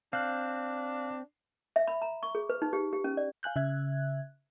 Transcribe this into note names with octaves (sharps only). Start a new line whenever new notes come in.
C4 D4 F5 F#6
E5
B5
A#5
C#6
G#4
B4
D#4
G4
G4
C#4
D5
F5 G#5 F#6 G6
C#3 E5 F#6 G#6